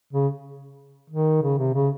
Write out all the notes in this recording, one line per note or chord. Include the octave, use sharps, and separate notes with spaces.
C#3
D#3
C#3
C3
C#3